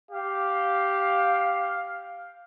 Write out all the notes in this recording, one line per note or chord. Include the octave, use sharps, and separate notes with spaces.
G4 F5